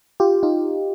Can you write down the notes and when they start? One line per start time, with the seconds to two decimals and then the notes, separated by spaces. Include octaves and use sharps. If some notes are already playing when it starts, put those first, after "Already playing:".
0.20 F4 G4
0.43 D#4 F4